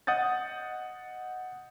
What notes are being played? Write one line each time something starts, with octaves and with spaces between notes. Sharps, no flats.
D#5 F#5 D#6 G6 A6